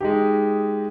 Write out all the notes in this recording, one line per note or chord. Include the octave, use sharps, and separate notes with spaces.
G#3 D#4 G4